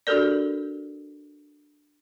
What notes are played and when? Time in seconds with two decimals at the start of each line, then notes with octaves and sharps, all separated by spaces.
0.07 D4 F#4 G4 A4 A#4 D5